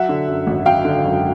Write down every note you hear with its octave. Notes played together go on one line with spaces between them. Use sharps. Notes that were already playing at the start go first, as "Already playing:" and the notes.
Already playing: F#3 E5 F#5
D3
F#2
G#1
F#3 F5 G5
D3
F#2